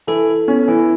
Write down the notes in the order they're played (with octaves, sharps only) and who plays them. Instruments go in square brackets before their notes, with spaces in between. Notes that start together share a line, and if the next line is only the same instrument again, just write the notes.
[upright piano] E3 E4 [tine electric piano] A4
[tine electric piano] B3 [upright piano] C#4
[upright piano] E3 E4